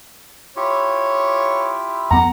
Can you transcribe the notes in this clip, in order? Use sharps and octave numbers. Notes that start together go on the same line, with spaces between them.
E4 F4 G4 C#5
F2 B3 F#5 A#5